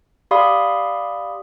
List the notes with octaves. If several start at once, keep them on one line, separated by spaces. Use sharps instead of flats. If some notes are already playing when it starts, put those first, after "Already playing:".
G4 D5 F5 B5 C6 D#6